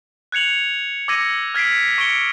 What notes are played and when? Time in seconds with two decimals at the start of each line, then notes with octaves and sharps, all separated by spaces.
0.32 F#6 G#6 C#7 F7 F#7
1.08 D6 E6 G#6 A#6 C#7 D#7
1.55 F6 G#6 B6 C7 D7
1.98 C#6 C#7 D7 G7